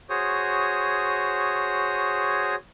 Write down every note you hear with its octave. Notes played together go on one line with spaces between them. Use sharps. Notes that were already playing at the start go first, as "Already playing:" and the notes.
F#4 G#4 C5 C#5 D#6